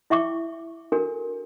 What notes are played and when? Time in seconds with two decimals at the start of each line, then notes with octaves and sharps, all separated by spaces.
0.10 E4 E5 G5 C#6 D6
0.92 D4 F#4 A4 A#4 G#5